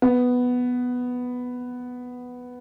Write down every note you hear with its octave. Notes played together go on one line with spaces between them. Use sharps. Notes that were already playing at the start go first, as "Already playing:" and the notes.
B3